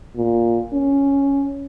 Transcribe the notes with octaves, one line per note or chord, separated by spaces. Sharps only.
A#2
C#4